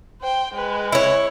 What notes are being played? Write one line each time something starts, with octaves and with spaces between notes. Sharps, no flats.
C5 G5
G#3 B4
E4 C#5